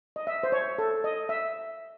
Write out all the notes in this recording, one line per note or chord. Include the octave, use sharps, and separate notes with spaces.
D#5
E5
C5
C#5
A4
D#5
E5